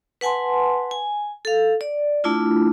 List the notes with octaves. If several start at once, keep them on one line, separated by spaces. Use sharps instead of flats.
B4 F#5 G#5 A5 C6
G#5
A4 F5
D5
A3 D4 E4 F4